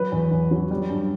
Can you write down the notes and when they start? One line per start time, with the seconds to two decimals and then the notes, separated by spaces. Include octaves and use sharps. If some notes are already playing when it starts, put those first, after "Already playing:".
Already playing: F#3 B4
0.12 E2
0.32 E2
0.51 F#3
0.71 G3
0.90 G2